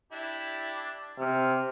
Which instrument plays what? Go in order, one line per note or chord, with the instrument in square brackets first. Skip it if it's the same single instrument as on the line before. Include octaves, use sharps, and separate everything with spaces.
[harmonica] D4 E4 G4
[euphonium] C3 [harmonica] F6